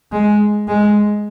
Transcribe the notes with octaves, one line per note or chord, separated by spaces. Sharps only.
G#3
G#3